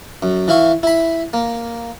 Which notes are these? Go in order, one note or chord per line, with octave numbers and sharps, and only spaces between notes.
F#2
E3 E4 F5 C#6
E4 B5
A#3